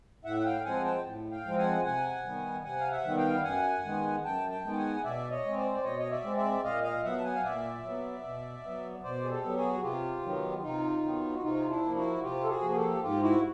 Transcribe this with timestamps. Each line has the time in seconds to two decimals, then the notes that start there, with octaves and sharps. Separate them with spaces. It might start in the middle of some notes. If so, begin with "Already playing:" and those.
0.24 A2 E5 F#5
0.40 F#5
0.45 F5 G5
0.64 F3 G#3 C4 F#5 G#5
0.84 G5 A5
1.05 A2
1.31 F5 G5
1.45 F3 G#3 C4
1.58 F#5 G#5
1.85 C3 F#5 G#5
2.25 D#3 G3 B3
2.64 C3 F#5 G#5
2.80 F5
2.91 E5 F#5
3.04 D#3 G3 B3
3.17 F5 G5
3.44 F#2 F#5 G#5
3.84 D#3 G#3 B3
4.24 F#2 G5 A5
4.51 G5 A5
4.64 D#3 G#3 B3
4.72 A5
4.77 F#5 G#5
5.04 B2 D5 E5
5.30 C#5 D#5
5.44 G#3 C4
5.57 C5 D5
5.74 D5
5.84 B2 C#5 D#5
5.99 D#5
6.11 D5 E5
6.24 G#3 C4
6.37 D5 E5
6.64 A#2 D#5 F5
6.83 D#5 F5
7.04 F#3 B3 E5 F#5
7.18 A5
7.24 F#5 G#5
7.35 F5
7.43 A#2 D5 E5
7.83 F#3 B3
8.23 B2
8.64 F#3 B3
9.03 B2 C5 D5
9.25 G#4
9.30 G4 A4
9.43 F#3 B3
9.57 F#4 G#4
9.82 C3 F4 G4
10.22 D#3 F#3 B3
10.63 C3 D#4 F4
11.03 D#3 F#3 B3
11.34 F#4
11.42 C3 D#4 F4
11.69 D4 E4
11.82 F3 A#3
11.96 E4 F#4
12.22 C3 F4 G4
12.43 A4
12.49 F#4 G#4
12.62 F3 A#3
12.71 G#4
12.76 G4 A4
13.03 G#2 F4 G4
13.22 E4 F#4